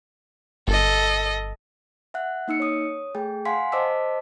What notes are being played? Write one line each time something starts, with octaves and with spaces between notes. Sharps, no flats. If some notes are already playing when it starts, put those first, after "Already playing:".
G1 A4 D#5
E5 F#5 F#6
A#3 D#4 E6 C#7
C#5 D#6
A3 G#4 G5
F5 F#5 G#5 C6 B6
C5 D#5 A5 D6 E6 B6